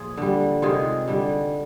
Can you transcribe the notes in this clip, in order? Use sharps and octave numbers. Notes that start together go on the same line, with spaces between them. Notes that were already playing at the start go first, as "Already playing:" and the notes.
Already playing: A#2 F3 F4 G#4
D3 G3
C3 D#3 G#3 F4 G#4
D3 G3